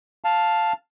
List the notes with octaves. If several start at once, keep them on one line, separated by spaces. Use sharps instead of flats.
F5 A5